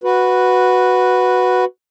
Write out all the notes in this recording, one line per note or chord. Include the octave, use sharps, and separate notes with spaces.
F#4 B4